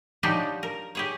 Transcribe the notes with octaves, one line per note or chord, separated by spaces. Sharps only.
F3 F#3 G#3 D4 D#4 G4
A#4
G4 G#4 C#5